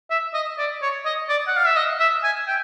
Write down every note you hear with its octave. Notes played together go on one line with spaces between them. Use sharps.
E5
D#5
D5
C#5
D#5
D5
F#5
F5
E5
D#5
E5
G#5
G5